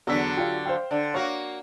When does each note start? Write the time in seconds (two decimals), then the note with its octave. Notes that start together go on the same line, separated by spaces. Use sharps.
0.07 E2 D3 F#3 E6 B6
0.37 D4 F4 G4
0.65 C5 F5 G5
0.91 D3
1.14 A#3 F#4 C#5 F5